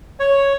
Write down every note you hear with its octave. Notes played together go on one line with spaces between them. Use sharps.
C#5